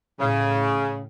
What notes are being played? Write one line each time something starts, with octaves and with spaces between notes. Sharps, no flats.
A2 C#3